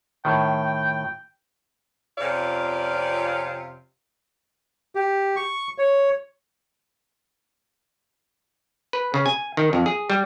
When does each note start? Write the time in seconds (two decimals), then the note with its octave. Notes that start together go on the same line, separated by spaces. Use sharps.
0.25 A2 D#3 G5
2.18 F2 C3 C#4 F4 D5 F5
4.95 G4
5.36 C#6
5.78 C#5
8.93 B4
9.14 C#3
9.26 G#5
9.57 D#3
9.73 F2
9.86 G#4
10.10 G3